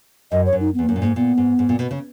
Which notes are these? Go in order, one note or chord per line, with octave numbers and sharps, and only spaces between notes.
F#2 D#5
C#5
F#2
D#4
E2 B3
A#3
F#2
A#2
G#2 A#3
A#2 B3
G#2
G#2
A#2
B2
C#3